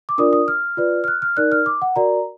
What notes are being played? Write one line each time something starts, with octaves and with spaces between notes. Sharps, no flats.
D6
D4 F4 A#4 D5 D#6
D#6
F6
F4 B4 D5
F6
F#6
F6
D#4 A#4 D5 F#6
F6
D6
F#5
F#4 A#4 D5 A#5